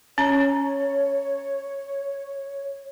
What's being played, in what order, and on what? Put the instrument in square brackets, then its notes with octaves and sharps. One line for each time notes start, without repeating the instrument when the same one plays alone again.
[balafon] C#4 A#5 [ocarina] C#5